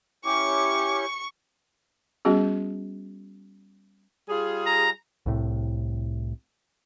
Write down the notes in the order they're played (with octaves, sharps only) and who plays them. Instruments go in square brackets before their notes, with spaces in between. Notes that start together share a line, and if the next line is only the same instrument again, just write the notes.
[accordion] C#4 E4 G4 [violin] C#6 [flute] D6
[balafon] G3 B3 C#4 F#4 G#4
[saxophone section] G3 F4 G#4
[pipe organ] A#5
[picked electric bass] C2 A2 C3